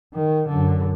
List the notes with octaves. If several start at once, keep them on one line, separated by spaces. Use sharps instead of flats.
D#3
F#2 D3